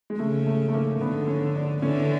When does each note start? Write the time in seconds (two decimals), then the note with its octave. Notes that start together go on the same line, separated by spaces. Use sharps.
0.10 G#3
0.19 C#3 A3
0.47 A3
0.69 A3
0.74 A#3
1.01 D3 B3
1.28 C#4
1.56 D4
1.82 D3 E3 C#4